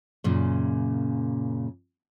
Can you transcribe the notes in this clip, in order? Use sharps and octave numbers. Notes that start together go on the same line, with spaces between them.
F#2 A#2 C#3